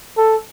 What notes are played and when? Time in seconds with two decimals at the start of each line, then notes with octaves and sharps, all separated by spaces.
0.17 A4